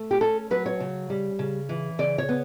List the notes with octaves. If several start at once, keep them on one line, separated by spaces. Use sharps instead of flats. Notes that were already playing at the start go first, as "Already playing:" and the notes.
Already playing: A3
G4
C#4 A4
F#3 B4
C#5
C#3
G3
C#3
E3
C#3 D5
C#5
B3